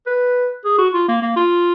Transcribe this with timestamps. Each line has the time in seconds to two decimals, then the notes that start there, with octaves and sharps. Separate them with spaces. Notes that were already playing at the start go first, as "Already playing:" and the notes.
0.06 B4
0.65 G#4
0.78 F#4
0.94 F4
1.08 A#3
1.22 A#3
1.36 F4